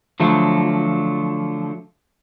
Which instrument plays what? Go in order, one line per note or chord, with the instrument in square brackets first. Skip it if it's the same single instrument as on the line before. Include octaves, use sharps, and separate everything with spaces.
[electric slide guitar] D3 F3 F#3 A3